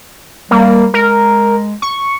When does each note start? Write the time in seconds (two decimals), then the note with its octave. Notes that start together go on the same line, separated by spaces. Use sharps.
0.51 G3 A#3
0.94 G#3 A#4
1.82 C#6